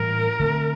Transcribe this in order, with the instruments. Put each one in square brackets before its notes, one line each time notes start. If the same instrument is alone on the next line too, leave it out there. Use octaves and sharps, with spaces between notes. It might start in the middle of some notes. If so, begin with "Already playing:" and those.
Already playing: [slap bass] A2 E3 G3 A#3 [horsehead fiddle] A#4
[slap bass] D3 A3 C4